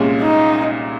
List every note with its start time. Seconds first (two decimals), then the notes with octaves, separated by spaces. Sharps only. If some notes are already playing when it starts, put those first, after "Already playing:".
Already playing: C2 A#2 G#3 C#4
0.21 D#4